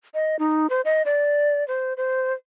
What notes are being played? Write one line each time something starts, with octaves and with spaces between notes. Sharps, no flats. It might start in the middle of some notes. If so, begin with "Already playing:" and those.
D#5
D#4
C5
D#5
D5
C5
C5